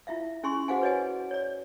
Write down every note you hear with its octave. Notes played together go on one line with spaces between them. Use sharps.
E4 F4 E5 F5
C#4 E4 G#4 G#5 C6 C#6
F#4 G#4 C5 F5 F#5 G#5
B4 C#5 D#5 G#5
C#5 D5